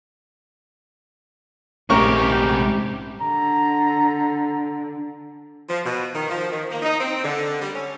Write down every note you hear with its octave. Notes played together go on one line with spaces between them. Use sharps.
A#1 G#2 C3 A3 C#4 G4 A#4 C#6
D3 A#5
F3
B2
D#3
F3
D#3
A#3
D#4
C4
D3
G3
C#4